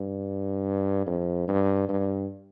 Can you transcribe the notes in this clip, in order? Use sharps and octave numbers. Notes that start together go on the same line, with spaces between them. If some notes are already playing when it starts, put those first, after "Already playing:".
Already playing: G2
F2
G2
G2